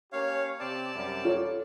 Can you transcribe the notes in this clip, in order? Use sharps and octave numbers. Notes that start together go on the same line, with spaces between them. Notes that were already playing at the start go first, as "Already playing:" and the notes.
A#3 C#4 G4 C#5 F5
C3 C4 G4 D5 A5
F#2 C3 G3
F4 A4 C#5